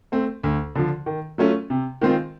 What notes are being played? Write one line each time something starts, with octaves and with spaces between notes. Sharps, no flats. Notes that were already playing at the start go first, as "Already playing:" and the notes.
A3 C4
D2
D3 F3
D#3
F#3 A3 C#4 F4
C3
D#3 G#3 C4 F4